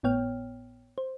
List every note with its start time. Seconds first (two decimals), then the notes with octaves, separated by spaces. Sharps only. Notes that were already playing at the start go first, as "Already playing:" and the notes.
0.03 G#1 A2 B3 C#5 G5 F6
0.98 C5